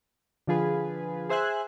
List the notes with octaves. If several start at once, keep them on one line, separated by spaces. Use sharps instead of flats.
D3 F3 F4 G#4 B4
G#4 C5 E5 G#5 F#6